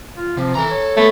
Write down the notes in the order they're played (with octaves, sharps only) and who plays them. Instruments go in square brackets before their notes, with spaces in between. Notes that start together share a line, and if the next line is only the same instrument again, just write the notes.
[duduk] F4
[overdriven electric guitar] C3 [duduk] F3
[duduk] E3 [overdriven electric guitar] A4 A#5
[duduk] C#5
[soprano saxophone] A3 [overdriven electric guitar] B3